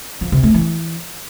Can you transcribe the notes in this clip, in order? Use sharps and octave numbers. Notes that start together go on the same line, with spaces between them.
F3
C3
A3
E3